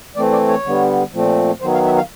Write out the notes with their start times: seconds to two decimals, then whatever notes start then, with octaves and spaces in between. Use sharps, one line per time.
0.16 E3 A3 C4 D5
0.32 D5
0.48 C#5
0.65 D3 G3 B3
1.12 A#2 F3 A3 C4
1.61 D#3 F#3 B3 C5
1.74 F5
1.85 E5
1.97 F5